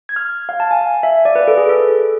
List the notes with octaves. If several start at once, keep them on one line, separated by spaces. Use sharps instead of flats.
G#6
F6
F5
A5
G#5
F5
E5
D5
B4
A4
G#4
A4